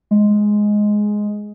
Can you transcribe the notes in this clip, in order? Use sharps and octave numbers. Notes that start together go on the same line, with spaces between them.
G#3